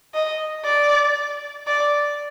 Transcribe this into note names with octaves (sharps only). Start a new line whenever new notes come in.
D#5
D5
D5